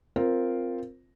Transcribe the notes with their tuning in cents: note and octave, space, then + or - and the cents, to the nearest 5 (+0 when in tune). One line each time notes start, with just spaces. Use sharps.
C4 +0 F4 +0 A#4 +0